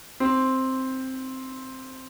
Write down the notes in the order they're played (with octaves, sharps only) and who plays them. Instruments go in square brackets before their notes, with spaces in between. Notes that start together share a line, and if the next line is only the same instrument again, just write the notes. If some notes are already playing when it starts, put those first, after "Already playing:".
[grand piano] C4